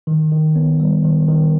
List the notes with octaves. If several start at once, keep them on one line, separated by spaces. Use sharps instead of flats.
D#3
D#3
B3
G3
D#3
D#3